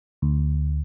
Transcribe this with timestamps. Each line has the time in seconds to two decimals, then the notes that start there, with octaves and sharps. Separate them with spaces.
0.22 D2